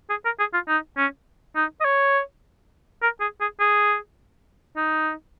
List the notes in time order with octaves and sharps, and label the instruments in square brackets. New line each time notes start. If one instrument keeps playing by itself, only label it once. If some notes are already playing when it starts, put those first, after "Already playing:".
[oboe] G#4
A#4
G#4
F4
D#4
C#4
D#4
D#5
C#5
A#4
G#4
G#4
G#4
D#4